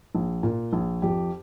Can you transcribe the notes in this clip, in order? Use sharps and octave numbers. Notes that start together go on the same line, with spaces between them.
A#1
A#2
A#1
F2 G4